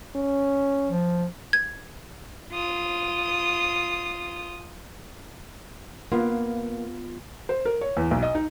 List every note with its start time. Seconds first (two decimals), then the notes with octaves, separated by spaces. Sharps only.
0.15 C#4
0.87 F3
1.53 G#6
2.52 F4 D#6
6.12 A#3 B3 F4
7.49 C5
7.65 A#4
7.81 C#5
7.97 E2
8.11 B1
8.23 D#5
8.35 D#4